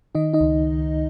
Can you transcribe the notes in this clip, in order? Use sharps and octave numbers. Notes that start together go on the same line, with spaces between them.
D#3 D#4 D#5
D#4 D#5
C#2